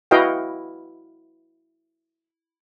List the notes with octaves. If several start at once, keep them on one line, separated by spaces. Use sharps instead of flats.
E4 F#4 B4 D#5 F5 G5